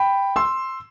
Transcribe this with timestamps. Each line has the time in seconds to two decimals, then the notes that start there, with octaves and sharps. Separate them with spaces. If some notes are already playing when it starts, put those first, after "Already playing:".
Already playing: G5 B5
0.36 C6 E6